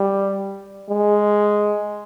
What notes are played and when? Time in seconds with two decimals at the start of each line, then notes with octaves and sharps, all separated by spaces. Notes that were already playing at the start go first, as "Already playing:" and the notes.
Already playing: G3
0.90 G#3